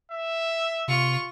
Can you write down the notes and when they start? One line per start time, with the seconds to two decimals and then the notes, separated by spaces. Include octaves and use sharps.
0.11 E5
0.88 C3 F4 C#6